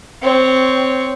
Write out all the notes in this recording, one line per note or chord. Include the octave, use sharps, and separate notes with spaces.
C4 C#5